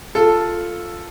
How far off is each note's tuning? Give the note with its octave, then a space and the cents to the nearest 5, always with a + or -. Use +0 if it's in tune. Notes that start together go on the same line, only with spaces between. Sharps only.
F4 +0 A4 +0